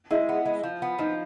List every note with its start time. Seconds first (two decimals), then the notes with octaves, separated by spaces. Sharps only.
0.11 G#3 E4
0.29 B3
0.45 G#3
0.63 F3
0.82 B3
0.99 F3 D#4